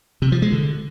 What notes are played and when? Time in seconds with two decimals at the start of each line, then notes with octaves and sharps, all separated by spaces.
0.22 C3
0.32 F3
0.42 G#3
0.52 D3